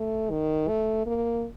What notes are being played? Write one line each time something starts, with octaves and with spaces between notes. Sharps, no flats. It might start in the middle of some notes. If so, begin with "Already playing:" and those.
Already playing: A3
D#3
A3
A#3